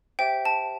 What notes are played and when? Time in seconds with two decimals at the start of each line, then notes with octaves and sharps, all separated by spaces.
0.19 G4 C5 E5 G5
0.45 A5